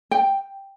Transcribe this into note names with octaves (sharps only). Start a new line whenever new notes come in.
G5